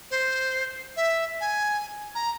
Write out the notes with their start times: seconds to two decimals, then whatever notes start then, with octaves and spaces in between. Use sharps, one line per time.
0.11 C5
0.97 E5
1.41 G#5
2.15 A#5